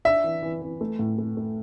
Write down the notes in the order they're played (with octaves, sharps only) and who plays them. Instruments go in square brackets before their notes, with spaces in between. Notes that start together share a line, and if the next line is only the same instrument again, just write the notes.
[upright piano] D4 [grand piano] E5
[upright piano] E3
E3
E3
A3
A2
A3
A3